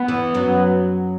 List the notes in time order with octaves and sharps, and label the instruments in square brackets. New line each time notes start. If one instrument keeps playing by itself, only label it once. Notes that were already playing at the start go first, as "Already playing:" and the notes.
Already playing: [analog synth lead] B3
[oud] E2 E3
F#2 F#3